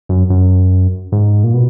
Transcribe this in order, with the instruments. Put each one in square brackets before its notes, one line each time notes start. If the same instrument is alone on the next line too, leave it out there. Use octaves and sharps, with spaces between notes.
[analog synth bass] F#2
F#2
G#2
A#2
B2